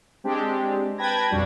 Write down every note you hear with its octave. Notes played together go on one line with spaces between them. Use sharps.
G#3 C4 D4 G4
B4 G5 A5 B5 G#6 A#6
B1 F2 G3 D4 F#4